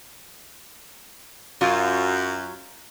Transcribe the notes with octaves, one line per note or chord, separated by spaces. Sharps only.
F#2 F#3 F4